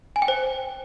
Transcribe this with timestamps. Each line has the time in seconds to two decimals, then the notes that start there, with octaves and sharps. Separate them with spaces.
0.16 G#5
0.22 G5
0.28 C5